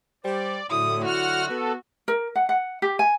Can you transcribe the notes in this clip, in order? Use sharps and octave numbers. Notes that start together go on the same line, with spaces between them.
G3 C5 D5
A2 D3 F#3 E4 D#6
F#4 F#5 F6
B3 A4
A#4
F#5
F#5
G4
G#5